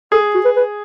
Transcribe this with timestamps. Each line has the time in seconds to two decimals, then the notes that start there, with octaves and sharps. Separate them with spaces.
0.12 G#4 A4
0.34 F#4
0.45 B4
0.56 B4